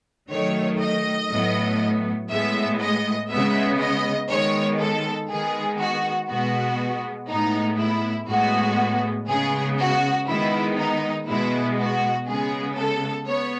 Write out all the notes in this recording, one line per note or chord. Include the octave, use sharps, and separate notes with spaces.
D#3 F#3 A3 C#5
D#5
A2 F#3 B3
A2 G#3 B3 E5
D#5
C#3 G#3 B3 E5
D#5
D#3 G#3 B3 C#5
A4
D#3 G#3 B3 G#4
F#4
B2 G#3 B3 F#4
A2 G#3 B3 D#4
E4
A2 G#3 B3 F#4
C#3 G#3 B3 G#4
F#4
D#3 G#3 B3 E4
D#4
B2 G#3 B3 E4
F#4
C#3 G#3 B3 G#4
A4
B3 C#5